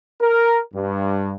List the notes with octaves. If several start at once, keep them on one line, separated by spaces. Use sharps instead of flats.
A#4
G2